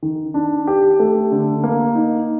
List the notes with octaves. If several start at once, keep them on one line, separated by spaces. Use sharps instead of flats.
D#3
D4
G4
A3
D3
A#3
D#4